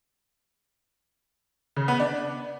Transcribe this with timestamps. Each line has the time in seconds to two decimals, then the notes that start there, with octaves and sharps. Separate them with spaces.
1.76 C#3
1.88 B3
2.00 D4